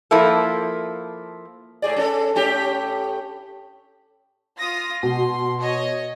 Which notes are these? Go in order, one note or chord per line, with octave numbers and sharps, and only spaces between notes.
F3 A#3 E4 A4
A2 G#4 D5
C#4 A4
A2 C#4 G4
F4 D#6 A#6
B2 C6
C#5 D#5